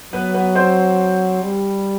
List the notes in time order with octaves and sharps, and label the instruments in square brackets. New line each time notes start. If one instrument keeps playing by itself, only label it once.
[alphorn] F#3 [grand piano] B3 B4
[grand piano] B3 B4
C4 C5
[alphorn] G3